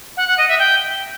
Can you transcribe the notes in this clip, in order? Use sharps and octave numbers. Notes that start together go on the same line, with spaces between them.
F#5
F#5
D#5
E5
G5